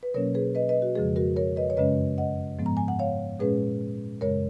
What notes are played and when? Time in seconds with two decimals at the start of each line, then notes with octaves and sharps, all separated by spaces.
0.03 B4
0.14 B2 F#3 A#3 C#4 A#4 C#5
0.34 G#4 B4
0.55 B4 D#5
0.69 B4 D#5
0.82 F#4
0.95 F2 C#3 F3 G#3 G#4
1.16 F#4 A#4
1.36 A#4 C#5
1.56 B4 D#5
1.70 C#5
1.77 F#2 C#3 G#3 C#4 B4 D#5
2.18 D#5 F#5
2.59 G#2 F3 G#3 B3
2.66 A#5
2.77 G#5
2.88 F#5
2.99 C#5 F5
3.40 A#2 G#3 C#4 G#4 B4
4.21 F#2 C#3 G#3 A#4 C#5